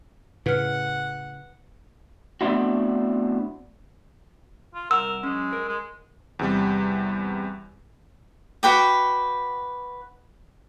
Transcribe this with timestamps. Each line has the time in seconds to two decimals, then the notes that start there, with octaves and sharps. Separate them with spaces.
0.46 A2 C#3 B4 F#5 F6
2.41 A3 B3 C4 D4 E4 F#4
4.75 F4
4.91 C2 A#4 F#5 E6
5.23 F#3 G#3 C#4
5.53 A#4
5.69 G#3
6.39 E2 C3 G3
8.63 F#4 B4 G5 D6